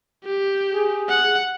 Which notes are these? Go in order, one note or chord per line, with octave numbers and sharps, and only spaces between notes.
G4
G#4
F#5